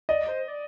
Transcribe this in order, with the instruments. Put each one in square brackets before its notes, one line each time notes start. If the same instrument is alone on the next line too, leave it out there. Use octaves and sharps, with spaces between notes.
[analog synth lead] D5 [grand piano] D#5
[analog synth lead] C5
D5